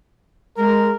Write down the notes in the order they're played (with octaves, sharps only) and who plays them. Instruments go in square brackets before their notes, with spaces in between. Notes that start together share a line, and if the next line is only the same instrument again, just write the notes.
[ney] G#3 [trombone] A#4